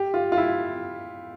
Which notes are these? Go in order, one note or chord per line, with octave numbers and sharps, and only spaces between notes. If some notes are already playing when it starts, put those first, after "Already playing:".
Already playing: G4
F4
F4
E4